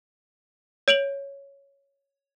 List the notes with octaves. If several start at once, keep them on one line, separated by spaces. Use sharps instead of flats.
C#5 D7 F7 F#7